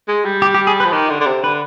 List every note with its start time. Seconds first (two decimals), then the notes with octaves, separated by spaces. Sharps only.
0.08 G#3
0.25 G3
0.42 G4
0.54 G4
0.67 G#4
0.80 B4
0.85 F3
0.92 D#3 G4
1.10 D3
1.20 D3
1.26 C3
1.43 D3 B4